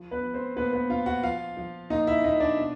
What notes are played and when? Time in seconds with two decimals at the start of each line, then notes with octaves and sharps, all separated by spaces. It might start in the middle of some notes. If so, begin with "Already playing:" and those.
Already playing: F3
0.11 B3 B4
0.23 F3
0.34 C4 C5
0.56 A#2 B3 B4
0.73 B3 B4
0.90 A#2 F4 F5
1.06 F#4 F#5
1.23 F3 F4 F5
1.57 F3
1.90 A#2 D#4 D#5
2.07 E4 E5
2.24 A#2 D#4 D#5
2.40 D4 D5
2.57 B2